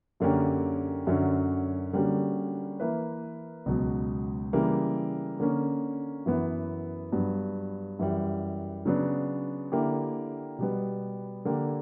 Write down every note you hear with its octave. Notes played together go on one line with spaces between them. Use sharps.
F#2 D3 A#3 C#4 G4
F#2 D3 F#3 C#4
D3 G3 A#3 C#4 F#4
E3 A#3 E4 B4
C#2 B2 F#3
C#3 E3 G3 A#3
D3 A#3 C#4
F#2 E3 B3
G2 F#3 B3
F#2 E3 G3
C#3 F#3 B3 D4
D3 A#3 E4 G4
B2 G3 B3
D3 A#3 D4 G4